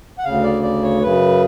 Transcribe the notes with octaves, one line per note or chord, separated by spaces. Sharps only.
F#5
D2 C#3 F5
D5
D5
C#5
F#2 C#3 B4